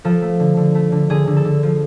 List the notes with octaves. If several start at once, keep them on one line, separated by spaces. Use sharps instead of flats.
F3 A4
A3
D3
D3
A3
D3
D3 G#4
D3
A4
D3
F3